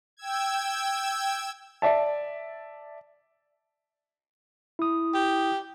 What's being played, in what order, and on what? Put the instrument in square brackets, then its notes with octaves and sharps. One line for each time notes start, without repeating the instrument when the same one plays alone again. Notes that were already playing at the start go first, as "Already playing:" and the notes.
[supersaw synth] G5 E6 G#6
[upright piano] D5 E5 A5
[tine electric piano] E4 D#6
[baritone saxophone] G4